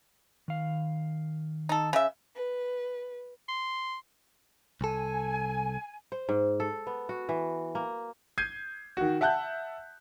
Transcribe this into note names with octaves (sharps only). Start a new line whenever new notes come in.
D#3 F5
D#4 A4
C#3 E5
B4
C6
C2 A4 G#5
C5
G#2
A4
B3
F#4
E3
A#3
G6 G#6 C7 D#7
D#3 F#4
E5 F#5 A5 F#6 G6